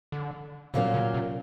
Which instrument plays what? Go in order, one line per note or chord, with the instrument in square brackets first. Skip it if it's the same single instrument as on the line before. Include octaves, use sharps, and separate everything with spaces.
[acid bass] D3
[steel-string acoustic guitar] A#2 F#3 A#3 C#4 F4 [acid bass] C#3
[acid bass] C#3
C3